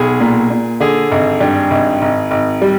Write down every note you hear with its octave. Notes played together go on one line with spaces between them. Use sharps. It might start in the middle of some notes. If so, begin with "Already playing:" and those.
Already playing: B1 G#4
A#2
A#2
D3 G#4
G#1
G2
G#1
G#1
G#1
G3